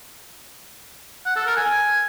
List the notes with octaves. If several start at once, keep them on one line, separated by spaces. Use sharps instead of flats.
F#5
A4
A#4
G#5